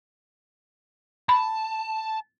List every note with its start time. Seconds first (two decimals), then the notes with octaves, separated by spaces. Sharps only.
1.29 A5 B5